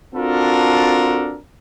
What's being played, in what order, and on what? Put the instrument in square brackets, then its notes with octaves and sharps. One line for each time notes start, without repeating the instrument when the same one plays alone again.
[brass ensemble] C4 D4 F4 F#4 A4 A#4